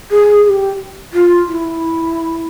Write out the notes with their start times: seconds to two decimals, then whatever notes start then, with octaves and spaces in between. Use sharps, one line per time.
0.11 G#4
0.45 G#4
0.49 G4
1.13 F4
1.47 E4